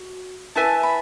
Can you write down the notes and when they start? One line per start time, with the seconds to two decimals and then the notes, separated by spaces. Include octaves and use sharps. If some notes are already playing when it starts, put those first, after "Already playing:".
Already playing: F#4
0.56 E4 B4 E5 G#5 A5
0.83 B5